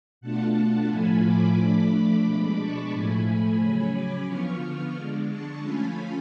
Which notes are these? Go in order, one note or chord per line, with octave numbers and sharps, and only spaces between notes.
B2 A3 D4 F4 F#5 A5
A2 F3 A3 F4 G#5 B5
B5 D6
F3 A3 D4
B2 G#3 D4 B5 D6
A5 C#6
A2 F3 A3 G#5 B5
C#3 F#3 C#4 G#5 B5
B5 D6
D3 F3 B3 F4 C#6 F6
D3 G#3 D4
A5 C#6
F3 A3 C#4 F4 G#5 B5